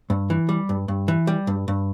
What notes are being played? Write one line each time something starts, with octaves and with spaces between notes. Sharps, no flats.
G2
E3
G3
G2
G2
E3
G3
G2
G2